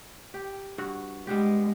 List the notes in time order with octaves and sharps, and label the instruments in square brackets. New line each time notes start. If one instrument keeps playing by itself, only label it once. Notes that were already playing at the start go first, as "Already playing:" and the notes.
[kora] G4
G2 F#4
[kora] G3 B3 G4 [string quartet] G#3